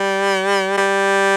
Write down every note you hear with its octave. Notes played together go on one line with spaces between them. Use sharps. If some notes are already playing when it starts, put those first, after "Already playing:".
Already playing: G3
G3